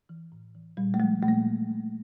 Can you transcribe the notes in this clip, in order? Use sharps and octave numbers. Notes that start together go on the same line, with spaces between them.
E3
A2
E3
A#2 G3
A3
F3 G#3
A#2 A3
A#3